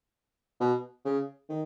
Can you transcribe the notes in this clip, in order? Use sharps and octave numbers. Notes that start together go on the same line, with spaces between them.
B2
C#3
D#3